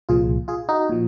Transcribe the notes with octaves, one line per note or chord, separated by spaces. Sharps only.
C2 A#2 F3 F4 G#4
F4 G#4
D#4 F#4
A#2 F3